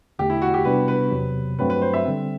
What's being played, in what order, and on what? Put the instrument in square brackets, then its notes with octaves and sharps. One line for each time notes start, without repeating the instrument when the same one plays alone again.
[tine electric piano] E2 D3 A3 [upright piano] G4
[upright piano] E4
F#4
G4
[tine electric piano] C3 G3 B3 D4 [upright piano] B4
[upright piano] B4
[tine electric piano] E2 C3 F#3
[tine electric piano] G2 F#3 A3 C4 F#4 [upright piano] B4
[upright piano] B4
C5
E5
[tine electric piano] D3 G3 C4